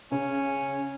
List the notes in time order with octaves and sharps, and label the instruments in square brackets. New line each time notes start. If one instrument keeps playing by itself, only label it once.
[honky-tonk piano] C#3 [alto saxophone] C#4